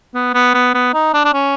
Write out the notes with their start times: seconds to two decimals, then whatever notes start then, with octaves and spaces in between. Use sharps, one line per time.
0.14 B3
0.34 B3
0.54 B3
0.74 B3
0.94 D#4
1.14 D4
1.25 D4
1.33 C#4